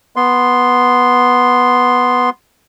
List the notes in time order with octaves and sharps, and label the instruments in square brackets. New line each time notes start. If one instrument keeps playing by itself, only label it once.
[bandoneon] B3 C6